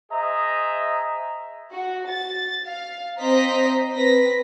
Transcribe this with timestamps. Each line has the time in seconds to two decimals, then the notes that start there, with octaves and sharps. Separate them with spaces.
0.11 G#4 C5 D#5 E5 A#5
1.73 F#4
2.10 A6
2.67 F5
3.20 C4 C5 D#5 A#5 B6
3.94 C4 B4 A#6 B6